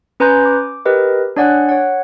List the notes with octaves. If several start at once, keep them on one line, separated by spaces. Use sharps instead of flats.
C#4 B4 G#5 A#5 C6 G6
D6
G4 A#4 B4 D#5
D4 C#5 D5 F#5 G#5 F#6
C#5 F#5